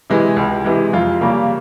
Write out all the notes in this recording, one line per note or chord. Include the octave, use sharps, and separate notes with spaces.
C3 E3 G#3
C#2
C3 E3 G#3
F2 F4
C#3 G3 A#3